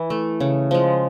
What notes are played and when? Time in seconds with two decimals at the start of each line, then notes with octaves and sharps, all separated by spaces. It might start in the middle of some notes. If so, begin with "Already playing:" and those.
Already playing: E3
0.10 A3
0.40 C#3
0.71 F3 G#3